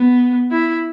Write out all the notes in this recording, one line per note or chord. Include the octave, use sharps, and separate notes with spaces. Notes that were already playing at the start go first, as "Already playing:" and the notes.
Already playing: B3
E4